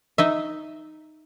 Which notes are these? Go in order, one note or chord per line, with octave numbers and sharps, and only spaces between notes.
D#4 D#5 E5